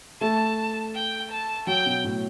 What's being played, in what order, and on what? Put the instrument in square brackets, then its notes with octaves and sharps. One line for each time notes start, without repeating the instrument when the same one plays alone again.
[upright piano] A3 [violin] A5
[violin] G5
A5
[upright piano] F#3 [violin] G5
[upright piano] B2
A2